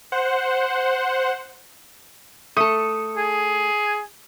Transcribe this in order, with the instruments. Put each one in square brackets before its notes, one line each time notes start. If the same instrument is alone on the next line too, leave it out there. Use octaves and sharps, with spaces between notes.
[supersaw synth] C5 F#5
[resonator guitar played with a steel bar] A3 A4 [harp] D#6
[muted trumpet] G#4